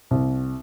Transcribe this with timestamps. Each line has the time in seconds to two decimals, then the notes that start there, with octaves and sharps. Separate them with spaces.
0.11 C2